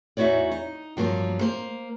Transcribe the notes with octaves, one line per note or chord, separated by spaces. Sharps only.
E2 D#4 E4 F#4 C#5 D5
D#4
G2 F3 F#3 A#3
A#3 C5